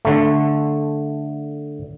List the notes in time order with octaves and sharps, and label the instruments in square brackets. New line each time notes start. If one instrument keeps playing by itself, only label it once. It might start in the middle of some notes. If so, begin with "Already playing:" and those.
[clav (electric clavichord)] D3 A3